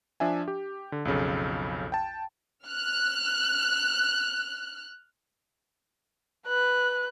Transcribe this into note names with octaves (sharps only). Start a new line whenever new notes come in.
F3 D4 E5 G#5
G4
D3
B1 F2 C#3 A4
G5 A5
F6 F#6
B4 F#6